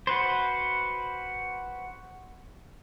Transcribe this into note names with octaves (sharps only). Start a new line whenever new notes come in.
F#4 B4 C5